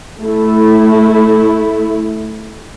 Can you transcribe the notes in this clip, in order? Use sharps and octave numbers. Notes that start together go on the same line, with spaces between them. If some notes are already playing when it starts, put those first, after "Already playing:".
A3 E4